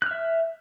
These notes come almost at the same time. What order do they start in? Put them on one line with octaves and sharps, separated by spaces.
F#6 F6 E5